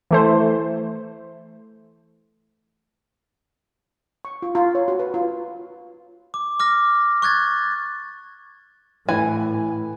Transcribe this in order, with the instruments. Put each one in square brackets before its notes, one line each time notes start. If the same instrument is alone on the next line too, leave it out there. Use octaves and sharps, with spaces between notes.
[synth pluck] E3 A3 C5
[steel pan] C#6
F4
F4
C#5
F#4
B4
F4
[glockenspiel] D6
D6 F6 A#6
C#6 F#6 G#6 A6
[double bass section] A2 [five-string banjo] E3 G#5